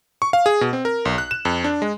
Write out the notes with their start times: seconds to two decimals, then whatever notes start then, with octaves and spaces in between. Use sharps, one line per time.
0.22 C#6
0.33 F5
0.46 G#4
0.61 B2
0.73 C4
0.85 A#4
1.05 B1
1.18 F#6
1.31 E7
1.45 F2
1.64 D4
1.82 G#3